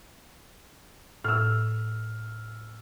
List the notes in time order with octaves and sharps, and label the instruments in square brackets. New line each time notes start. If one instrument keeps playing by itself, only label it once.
[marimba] A2 [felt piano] E6 F6